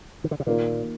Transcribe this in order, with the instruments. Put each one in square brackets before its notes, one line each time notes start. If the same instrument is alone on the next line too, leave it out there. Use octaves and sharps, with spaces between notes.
[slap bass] D#3
D3
C3
[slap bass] A#2 [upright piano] D#3 A#3 F4 A#4